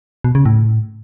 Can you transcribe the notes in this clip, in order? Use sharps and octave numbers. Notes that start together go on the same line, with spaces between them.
B2
C#3
A2